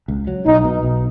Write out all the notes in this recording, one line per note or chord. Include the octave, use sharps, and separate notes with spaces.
C#2
F#3
B1 D#4
B2
B1